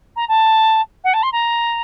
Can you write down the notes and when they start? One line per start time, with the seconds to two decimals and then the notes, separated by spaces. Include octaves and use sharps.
0.16 A#5
0.28 A5
1.04 F#5
1.14 A5
1.23 C6
1.32 A#5